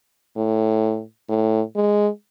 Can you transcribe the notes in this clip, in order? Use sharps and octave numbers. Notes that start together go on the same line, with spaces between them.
A2
A2
G#3